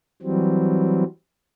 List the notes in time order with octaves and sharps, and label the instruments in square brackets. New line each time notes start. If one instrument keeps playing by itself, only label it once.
[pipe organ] E3 F#3 G3 C4